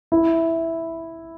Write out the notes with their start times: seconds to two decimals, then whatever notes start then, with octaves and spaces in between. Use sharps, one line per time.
0.12 E4